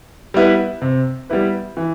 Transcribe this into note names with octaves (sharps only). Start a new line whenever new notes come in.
G3 B3 E4 B4
C3
G3 B3 E4 B4
E3